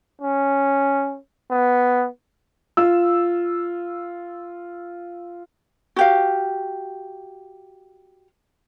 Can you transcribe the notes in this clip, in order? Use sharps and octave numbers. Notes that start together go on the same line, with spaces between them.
C#4
B3
F4 E6
F#4 G4 F5